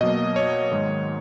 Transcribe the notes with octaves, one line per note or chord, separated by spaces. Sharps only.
B2 F#3 A#3 D#5
C#5
G#2 D#3 G#3